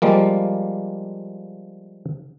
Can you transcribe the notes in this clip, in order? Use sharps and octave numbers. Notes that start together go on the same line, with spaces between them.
F3 G3 G#3 A#3